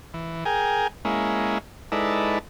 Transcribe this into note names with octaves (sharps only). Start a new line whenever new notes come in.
E3
G#4 A#4 G5 G#5
G#3 A#3 C#4 E4
G#3 D#4 E4 A4 B4 D5